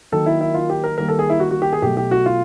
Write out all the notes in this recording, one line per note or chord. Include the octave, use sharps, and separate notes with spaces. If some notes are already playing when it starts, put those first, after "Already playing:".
D#3 F#3 A#3 A4
E4
E4
F4
G4
A#4
D#3 G3 A#3 A#4
A4
G#4
E4
F#4
F#4
G4
G#4
B2 F#3 A3 G4
G4
F#4
F4